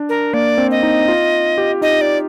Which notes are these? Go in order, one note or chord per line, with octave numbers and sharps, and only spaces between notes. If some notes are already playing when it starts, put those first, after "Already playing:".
Already playing: D4
A#4
A#3 D5
C4
D#5
D#4
F4
G4
D#4 D#5
D5